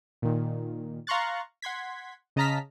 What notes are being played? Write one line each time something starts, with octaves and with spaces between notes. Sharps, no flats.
A#2 D#3
F5 A#5 C6 C#6 F#6 A6
F#5 C6 G#6 B6
C#3 D#5 A5 A#5 F6 B6